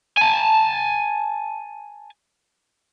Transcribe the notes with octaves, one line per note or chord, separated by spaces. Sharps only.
G#5 A5